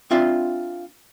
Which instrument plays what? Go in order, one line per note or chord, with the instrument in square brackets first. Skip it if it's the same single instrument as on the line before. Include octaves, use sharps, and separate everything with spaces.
[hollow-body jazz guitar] C4 D4 F4 E5 F5